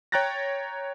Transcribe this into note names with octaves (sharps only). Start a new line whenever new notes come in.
C#5 G5 A#5 F#6 A6 A#6